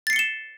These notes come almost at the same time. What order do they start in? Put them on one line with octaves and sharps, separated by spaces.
A6 C7 C#7 G7 E7